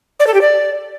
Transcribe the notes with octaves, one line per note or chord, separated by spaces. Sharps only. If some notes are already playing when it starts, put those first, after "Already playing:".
D5
A4
G4
D5